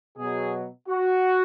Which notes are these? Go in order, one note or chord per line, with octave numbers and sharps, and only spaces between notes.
B2 F#3 G#4
F#4